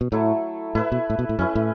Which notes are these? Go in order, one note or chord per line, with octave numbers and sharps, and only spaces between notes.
B2
A2 F#3 A3 E4 A4
A2 E4 B4 E5
B2
A2
B2
A2
F#2 C#4 E4 B4
A2